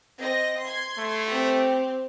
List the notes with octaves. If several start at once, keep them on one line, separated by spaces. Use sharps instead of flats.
C4 D#5 A#6
C6 G#6
A3
C4 G4